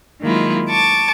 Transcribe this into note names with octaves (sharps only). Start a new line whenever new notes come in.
D#3 F#3 G#3 A#3 E4 F4
A5 C#6 D6